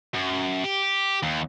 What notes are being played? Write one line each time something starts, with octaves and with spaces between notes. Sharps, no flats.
F#2
G4
D#2